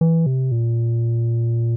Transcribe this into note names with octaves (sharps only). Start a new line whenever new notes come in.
E3
C3
A#2